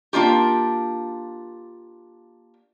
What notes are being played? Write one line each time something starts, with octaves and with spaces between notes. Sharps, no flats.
A#3 D4 F4 G4